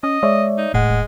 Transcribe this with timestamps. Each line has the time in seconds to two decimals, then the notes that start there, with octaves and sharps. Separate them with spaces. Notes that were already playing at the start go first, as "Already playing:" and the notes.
0.03 C#4 D#5
0.23 G#3 C#5 D5 E5
0.58 D#4
0.74 E1 A2 G#3 F#5
0.90 E1